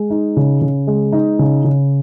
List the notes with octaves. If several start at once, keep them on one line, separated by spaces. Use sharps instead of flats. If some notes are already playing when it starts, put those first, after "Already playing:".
Already playing: G#3
D#4
C#3
C#3
G#3
D#4
C#3
C#3